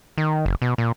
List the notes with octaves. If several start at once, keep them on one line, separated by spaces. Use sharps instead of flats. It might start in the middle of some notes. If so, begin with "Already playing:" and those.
D#3
F#1
B2
A#2